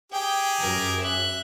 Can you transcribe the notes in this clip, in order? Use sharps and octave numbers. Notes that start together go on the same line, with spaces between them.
G4 G#4 G5
F#2 F#3 A#4
E5 F#6